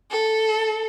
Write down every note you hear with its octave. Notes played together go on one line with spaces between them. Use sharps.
A4